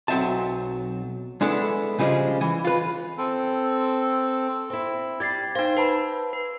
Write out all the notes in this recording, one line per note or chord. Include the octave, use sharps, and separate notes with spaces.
B1 F#3 C4 E5 A5
G#3 B3 D4 E4 A4
C#3 F3 G3 G#3
E3
F4 B4
C4 A4
C4 E4
G3 G4 G#6 A6 C7
D#4 C5 F5 G5
B4 A5 B5
B4